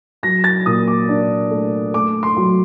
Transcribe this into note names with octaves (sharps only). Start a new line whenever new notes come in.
F#3 A#6
A6
A#2 D#6
D6
D4
A3
A3 D6
C6
F#3